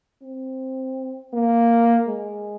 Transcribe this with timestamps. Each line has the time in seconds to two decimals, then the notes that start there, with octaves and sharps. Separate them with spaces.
0.23 C4
1.33 A#3
2.08 G#3